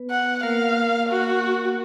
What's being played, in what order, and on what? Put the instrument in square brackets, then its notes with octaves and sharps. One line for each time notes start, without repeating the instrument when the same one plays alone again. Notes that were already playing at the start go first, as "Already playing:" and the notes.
Already playing: [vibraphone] B3 B4
[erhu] F#5
[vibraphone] A#3 A#4 [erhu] F5
[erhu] F#4